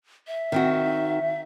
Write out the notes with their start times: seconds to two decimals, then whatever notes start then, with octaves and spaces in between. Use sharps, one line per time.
0.27 E5
0.52 D#3 C4 F#4